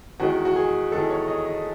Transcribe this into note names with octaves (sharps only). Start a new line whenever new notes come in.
E2 D#3 G#3 F#4
F#4
G#4
E2 D#3 G#3 A4
C#5
D#5
D#5